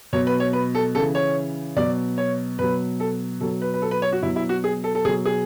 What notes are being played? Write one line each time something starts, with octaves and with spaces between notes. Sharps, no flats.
B2 F#3 C#5
B4
C#5
B4
A4
C#3 E3 A4
C#5
B2 F#3 D5
C#5
B2 F#3 B4
A4
B2 F#3 A4
B4
B4
A4
B4
C#5
F#4
B2 F#3 E4
E4
F#4
G#4
A4
A4
B2 F#3 G#4
G#4